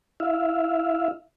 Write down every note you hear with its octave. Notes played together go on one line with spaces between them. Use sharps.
E4 E5 F5